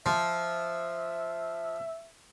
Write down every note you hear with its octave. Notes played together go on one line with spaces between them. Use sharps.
F3 E5